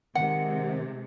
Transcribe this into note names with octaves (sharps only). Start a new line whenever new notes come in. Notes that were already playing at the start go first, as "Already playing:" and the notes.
C3 D#3 G#3 F#5